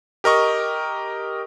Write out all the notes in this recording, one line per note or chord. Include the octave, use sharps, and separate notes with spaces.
G4 A#4 D#5 C#6